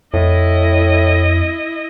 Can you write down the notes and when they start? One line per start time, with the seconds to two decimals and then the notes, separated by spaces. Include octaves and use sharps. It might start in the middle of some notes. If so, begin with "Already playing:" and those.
0.14 F2 A2 E4 D#5